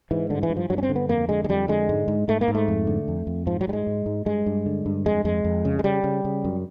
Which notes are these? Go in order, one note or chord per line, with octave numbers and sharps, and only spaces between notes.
G#2 E3
G2 D3
E3
G2
F3
G2 F#3
C#4
C4
D3
B3
F2 A#3
D3 G#3
G#3
F2 G3
D3 G#3
G#2
G#2
G#2 A3
A#3
G#2
A3
F2
D3
F2
F2
G#2 F3
F#3
G#2 G3
G#3
G#2
G#2
G2 G#3
G2
D3
G2
F2 G#3
F2 G#3
F2
C#3
G#3
C#3 G3
C#3
C#3
F#2